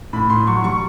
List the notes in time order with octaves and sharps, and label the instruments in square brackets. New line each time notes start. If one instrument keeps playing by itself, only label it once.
[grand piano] A2 B5
A2 C6
F#3 C#6
G3 C#6